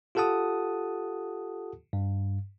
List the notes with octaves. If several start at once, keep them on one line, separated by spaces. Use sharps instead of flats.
F4 G4 A4 F#5 A5 D#6
G2